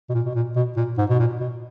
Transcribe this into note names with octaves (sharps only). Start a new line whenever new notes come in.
B2
A#2
B2
A#2
B2
A#2
G#2
B2
A#2
B2